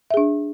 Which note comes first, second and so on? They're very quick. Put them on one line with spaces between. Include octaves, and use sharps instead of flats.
E5 G#4 D4